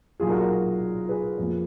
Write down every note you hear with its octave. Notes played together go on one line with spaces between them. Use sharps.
B1 A#2 F#3 F4 G#4
F#4 A#4
F#4 A#4
G#4 B4
F2 F3 A#3